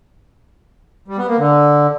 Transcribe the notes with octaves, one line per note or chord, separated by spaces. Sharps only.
G3
B3
A#3
D3